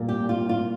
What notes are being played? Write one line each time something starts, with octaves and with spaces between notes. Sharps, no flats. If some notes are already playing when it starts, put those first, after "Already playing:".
Already playing: A#2 G3 A#3
G4
F4
F4